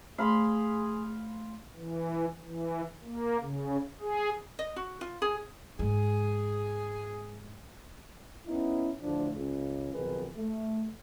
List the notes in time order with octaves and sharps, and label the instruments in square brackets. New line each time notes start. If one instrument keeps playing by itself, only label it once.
[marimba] A3 [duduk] G#4 [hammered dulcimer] F5 B5 C6
[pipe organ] E3
E3
A#3
C#3
G#4
[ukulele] D#5
F#4
F4
G#4
[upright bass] G#2 G#3 [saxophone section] G#4
[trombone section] B3 C#4 D#4 E4
D2 A2 F3 D4
C#2
B1 F2 D#3 G#4 B4
A3